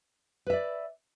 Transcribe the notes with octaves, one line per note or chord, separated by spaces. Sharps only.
B4 D5 E5